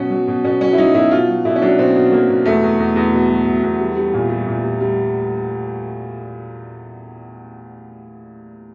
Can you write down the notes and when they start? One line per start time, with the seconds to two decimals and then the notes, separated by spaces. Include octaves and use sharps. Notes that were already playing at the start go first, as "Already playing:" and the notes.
Already playing: B2 F#3 C#4
0.10 F#3
0.28 B2
0.44 B2 C#4
0.61 F#3 C#4
0.73 E4
0.78 F#3 D#4
0.94 B2 E4
1.11 B2 F4
1.28 F#3
1.45 B2 E4
1.56 C#4
1.61 F#3 D4
1.78 B2 C4
1.95 B2
2.12 F#3 A#3
2.29 B2
2.45 E2 A3
2.63 E2
2.79 E2
2.96 E2
3.13 B2
3.30 F#3
3.47 B2
3.63 E2
3.80 G3
3.97 G3
4.13 A#2
4.30 G3
4.47 A#2
4.63 G3
4.80 G3